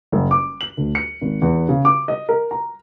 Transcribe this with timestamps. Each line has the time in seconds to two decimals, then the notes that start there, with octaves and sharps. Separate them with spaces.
0.12 F#1
0.31 D6
0.61 F#7
0.77 D2
0.95 C#7
1.21 G#1
1.42 E2
1.69 C#3
1.85 D6
2.08 D#5
2.29 A#4
2.51 A#5